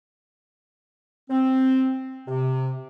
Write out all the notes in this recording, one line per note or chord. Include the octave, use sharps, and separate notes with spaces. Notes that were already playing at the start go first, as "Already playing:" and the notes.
C4
C3